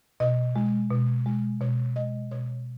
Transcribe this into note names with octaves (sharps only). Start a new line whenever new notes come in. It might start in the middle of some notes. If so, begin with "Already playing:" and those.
B2 D#5
G#3
B2
G#3
B2 C#5
G#3 D#5
B2 C#5